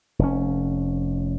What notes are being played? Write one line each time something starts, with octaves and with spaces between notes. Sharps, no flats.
F1 C#4